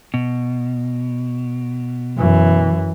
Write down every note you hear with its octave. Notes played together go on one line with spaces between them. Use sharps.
B2
F#2 E3